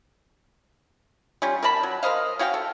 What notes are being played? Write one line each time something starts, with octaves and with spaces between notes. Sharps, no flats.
G3 C#4 F4
A#4 D5 A5 B5
F#3
A#4 C5 D#5 F5
C#4 F#4 F5 G5
A4